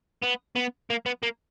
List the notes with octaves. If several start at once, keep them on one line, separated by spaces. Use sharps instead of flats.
B3
B3
A#3
B3
A#3